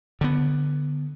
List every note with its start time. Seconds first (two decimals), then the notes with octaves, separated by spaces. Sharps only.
0.21 D3 B3